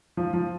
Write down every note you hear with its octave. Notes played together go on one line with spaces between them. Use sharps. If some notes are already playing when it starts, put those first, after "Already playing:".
F3
F3